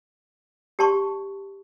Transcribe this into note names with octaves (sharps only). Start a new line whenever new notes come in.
G4 D5 A5 C6 C#6